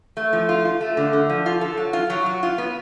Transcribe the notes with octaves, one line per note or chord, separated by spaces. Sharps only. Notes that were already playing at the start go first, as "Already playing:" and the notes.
A3
F3
F4
F4
A3
D3
D3
F3
F4
A4
F#3
F4
F#3
F#3
F4
B3